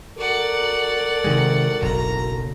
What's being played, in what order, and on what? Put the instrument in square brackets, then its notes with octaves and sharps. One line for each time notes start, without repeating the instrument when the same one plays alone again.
[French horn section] F#4 A4 A#4 [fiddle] D5 F#5
[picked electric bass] C3 D#3 G#3
[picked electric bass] F#1 B1 [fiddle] A#5